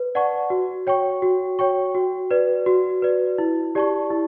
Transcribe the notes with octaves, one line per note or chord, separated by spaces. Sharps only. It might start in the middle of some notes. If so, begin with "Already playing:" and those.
Already playing: B4
D5 F#5 A5 C#6
F#4
C#5 G5 C#6
F#4
C#5 G5 C#6
F#4
B4 D5
F#4
B4 D5
E4
G4 D5 A5 C#6
E4